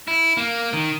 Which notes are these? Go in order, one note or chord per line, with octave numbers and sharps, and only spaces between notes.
E4
A#3
D#3